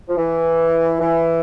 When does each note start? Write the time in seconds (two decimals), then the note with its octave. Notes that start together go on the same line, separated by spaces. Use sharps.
0.08 F3
0.17 E3
1.00 E3